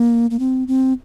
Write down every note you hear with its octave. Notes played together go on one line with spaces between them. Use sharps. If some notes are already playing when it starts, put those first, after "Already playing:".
Already playing: A#3
A#3
C4
C4